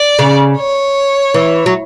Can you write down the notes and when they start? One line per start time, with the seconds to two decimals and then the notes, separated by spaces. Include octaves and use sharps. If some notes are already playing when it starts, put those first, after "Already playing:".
Already playing: D5
0.19 C#3
0.57 C#5
1.34 E3
1.66 F#3